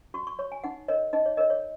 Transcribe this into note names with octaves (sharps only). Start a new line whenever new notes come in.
F#4 C#6
C#6
C#5 C#6
G#5
D#4 F#5
A#4 C#5 D#5
D#4 D#5
C#5
A#4 C#5 D#5
C#5